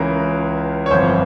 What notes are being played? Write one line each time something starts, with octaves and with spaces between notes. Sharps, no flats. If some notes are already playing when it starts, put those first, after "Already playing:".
Already playing: C#2 C#3 E3 A#4
C#5
G1 F2 E3 C5